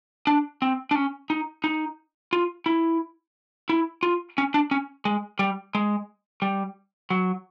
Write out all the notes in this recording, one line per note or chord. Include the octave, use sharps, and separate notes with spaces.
D4
C4
D4
C#4
D#4
D#4
F4
E4
E4
F4
C#4
D4
C#4
G#3
G3
G#3
G3
F#3